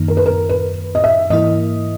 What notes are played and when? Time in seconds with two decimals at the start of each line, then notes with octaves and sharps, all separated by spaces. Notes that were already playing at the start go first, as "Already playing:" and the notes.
Already playing: F#2 D#3 A#3 D#4
0.08 A#4
0.17 B4
0.26 A#4
0.49 B4
0.95 D#5
1.04 E5
1.30 G#2 E3 A#3 E4 A#4 D#5